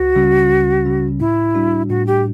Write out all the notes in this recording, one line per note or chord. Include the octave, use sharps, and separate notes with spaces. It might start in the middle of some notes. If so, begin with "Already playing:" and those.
Already playing: C#2 F#4
C#3 G3 C#4
C#2
C#3 G3 C#4
A2 E4
G3 D4 F#4
A2 F#4
G4